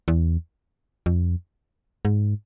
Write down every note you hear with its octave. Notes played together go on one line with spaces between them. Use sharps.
E2
F2
G#2